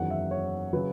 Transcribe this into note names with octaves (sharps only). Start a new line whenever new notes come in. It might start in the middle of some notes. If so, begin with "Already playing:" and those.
Already playing: F#1 E2 D#3 F#3 F#5
E5
C#5
C#3 F#3 B4